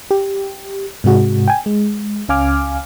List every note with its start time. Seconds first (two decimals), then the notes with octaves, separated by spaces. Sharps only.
0.11 G4
1.04 G#2 C3 G#3 F#4
1.48 G5 G#5
1.66 G#3
2.29 C#2 C#4 F5 G#5 D6 F6